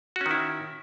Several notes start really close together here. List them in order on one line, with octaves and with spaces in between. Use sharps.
F#4 C#4 D#3 E4